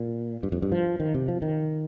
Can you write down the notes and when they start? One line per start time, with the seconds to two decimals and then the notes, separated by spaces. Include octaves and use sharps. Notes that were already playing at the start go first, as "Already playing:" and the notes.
Already playing: A#2
0.43 G2
0.52 F2
0.62 G2
0.72 F3
1.00 D#3
1.14 C3
1.28 F3
1.42 D#3